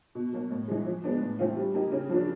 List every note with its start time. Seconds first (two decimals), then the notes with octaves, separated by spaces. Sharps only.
0.15 B2
0.33 F#3 A#3
0.50 A2
0.68 E3 G#3
0.86 F3
1.04 G#3 B3 D4
1.21 A2
1.39 E3 A3 C4 F4
1.57 G3
1.74 A#3 D#4 G4
1.92 C#3
2.09 F3 A#3 D4 F#4